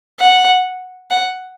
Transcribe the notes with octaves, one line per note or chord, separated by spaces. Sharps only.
F#5
F#5